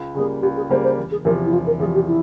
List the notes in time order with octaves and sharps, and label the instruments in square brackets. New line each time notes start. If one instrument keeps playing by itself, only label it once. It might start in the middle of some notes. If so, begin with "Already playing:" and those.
Already playing: [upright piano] C#2
[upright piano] C#3 G3 A#3 [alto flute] G#4
[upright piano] C#2 [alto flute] G4
[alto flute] G#4
[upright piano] C#3 G3 A#3 [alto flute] C5
[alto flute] C5
[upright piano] E1
[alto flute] G#4
[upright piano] E2 C3 F3 [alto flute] A#4
[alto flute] E4
[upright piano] E1 [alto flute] F4
[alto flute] A#4
[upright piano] E2 C3 F3 [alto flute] G#4
[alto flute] G4
E4